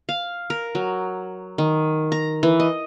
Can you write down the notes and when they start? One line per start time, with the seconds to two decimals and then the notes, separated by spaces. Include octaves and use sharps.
0.09 F5
0.50 A#4
0.75 F#3
1.58 D#3
2.12 A#5
2.43 E3
2.60 D#5